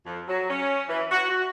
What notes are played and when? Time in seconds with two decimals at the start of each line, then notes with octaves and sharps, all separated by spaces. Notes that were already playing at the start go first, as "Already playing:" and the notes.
0.05 F2
0.28 F#3
0.49 C#4
0.89 E3
1.11 F#4
1.29 F#4